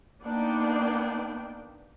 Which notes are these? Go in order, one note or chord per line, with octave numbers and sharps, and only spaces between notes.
A#3 B3 D4 D#4 D5 G5